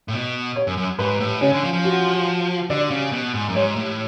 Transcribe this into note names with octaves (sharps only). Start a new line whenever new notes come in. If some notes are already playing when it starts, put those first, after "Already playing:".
A2
B2
C#5
F#2
F#2
G#2 B4
A2
C#3 C#4
D3
F3
F3
F#4
D3 D5
C#3
B2
G#2
F#2
G#2 C#5
A2